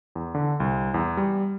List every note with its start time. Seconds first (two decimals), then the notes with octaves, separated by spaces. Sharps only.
0.15 E2
0.35 D3
0.60 C2
0.94 E2
1.17 G3